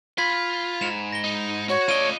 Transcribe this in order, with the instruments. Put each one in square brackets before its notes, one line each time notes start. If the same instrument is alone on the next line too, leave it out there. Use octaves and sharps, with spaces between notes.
[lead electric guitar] F4 [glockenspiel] B5 G#6 B6
[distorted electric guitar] G#2 [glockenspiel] E7 F7
[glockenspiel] A#6 G7
[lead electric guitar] D#4
[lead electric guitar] F#4 [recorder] C#5
[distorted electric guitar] A3 D5 [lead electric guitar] F4 D#5 [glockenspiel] D#7 G7